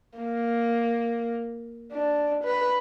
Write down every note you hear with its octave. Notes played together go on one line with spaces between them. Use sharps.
A#3
D4
B4